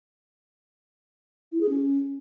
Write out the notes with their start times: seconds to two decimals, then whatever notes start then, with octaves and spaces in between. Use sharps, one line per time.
1.52 E4
1.61 G#4
1.69 C#4